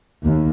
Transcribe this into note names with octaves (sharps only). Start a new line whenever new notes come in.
D#2